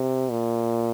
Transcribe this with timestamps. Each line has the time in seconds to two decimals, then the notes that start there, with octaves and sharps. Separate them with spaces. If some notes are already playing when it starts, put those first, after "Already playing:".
Already playing: C3
0.31 A#2